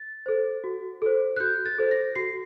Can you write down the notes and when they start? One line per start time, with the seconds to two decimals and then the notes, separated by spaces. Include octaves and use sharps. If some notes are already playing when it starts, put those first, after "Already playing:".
Already playing: A6
0.26 A4 C5
0.64 F#4
1.02 A4 C5
1.36 F#6
1.40 F#4 G6
1.66 A6
1.78 A4 C5
1.91 A#6
2.15 F#4 C7